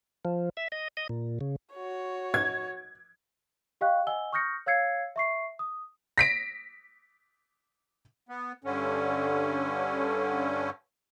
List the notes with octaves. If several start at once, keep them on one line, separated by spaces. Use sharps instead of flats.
F3
E5
D#5
D#5
A#2
C#3
F#4 C#5
G#6
G4 D#5 F5 G5 C#6 F#6
D#5 F#5 G#5 E6 G7
C#6 D#6 F6 G6 A#6 C#7
C#5 F5 E6 G#6 C7 C#7
E5 C#6 C7
D#6
A#6 B6 D7
B3
G2 D3 C#4